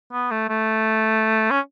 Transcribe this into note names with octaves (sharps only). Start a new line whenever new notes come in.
B3
A3
A3
C#4